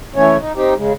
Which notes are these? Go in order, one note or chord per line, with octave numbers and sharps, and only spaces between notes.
E3 A3 C#4 C#5
D#4
C4 D#4 G4
C#3 G#3